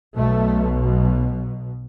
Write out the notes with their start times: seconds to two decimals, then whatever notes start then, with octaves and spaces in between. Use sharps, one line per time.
0.16 B1 B2 A3